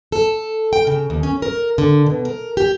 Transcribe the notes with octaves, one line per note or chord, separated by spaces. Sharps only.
A4
G5
C#3
D#2
C#4
A#4
D3
B2
A#4
G4